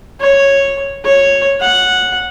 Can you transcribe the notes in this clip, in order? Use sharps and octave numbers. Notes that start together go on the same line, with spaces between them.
C#5
C#5
F#5